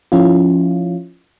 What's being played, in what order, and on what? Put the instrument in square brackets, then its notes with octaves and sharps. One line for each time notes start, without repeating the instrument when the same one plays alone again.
[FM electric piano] F3 C#4 E4 F4